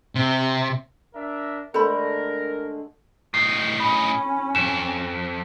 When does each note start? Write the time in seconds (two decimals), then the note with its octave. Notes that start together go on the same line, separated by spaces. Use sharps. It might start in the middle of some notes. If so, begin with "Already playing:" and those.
0.15 C3
1.15 D4 A#4 E5
1.74 D3 G#3 A3 A4 A#4 C5 B5
3.34 A2 D#4 C7
3.80 C#4 B5
4.55 F2 E7